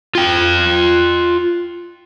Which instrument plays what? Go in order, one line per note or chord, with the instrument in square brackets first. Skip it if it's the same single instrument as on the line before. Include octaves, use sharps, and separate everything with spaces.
[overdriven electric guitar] F4 G5